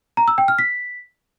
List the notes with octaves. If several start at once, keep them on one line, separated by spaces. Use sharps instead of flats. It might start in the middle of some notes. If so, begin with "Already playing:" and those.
A#5
E6
G5
F6
B6